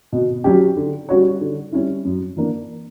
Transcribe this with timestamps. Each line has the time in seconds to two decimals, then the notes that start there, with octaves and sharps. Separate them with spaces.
0.12 B2
0.44 F#3 C#4 G4
0.77 D3
1.09 G3 C#4 F#4 C#5
1.41 D3
1.72 G3 C#4 E4
2.05 F#2
2.36 E3 A#3 D4 A#4